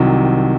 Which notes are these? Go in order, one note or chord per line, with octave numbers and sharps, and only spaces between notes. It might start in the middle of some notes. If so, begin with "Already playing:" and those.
Already playing: C2 C3 D#3 F#3